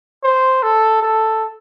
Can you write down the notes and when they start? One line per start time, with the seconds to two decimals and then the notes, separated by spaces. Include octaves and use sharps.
0.23 C5
0.63 A4
1.03 A4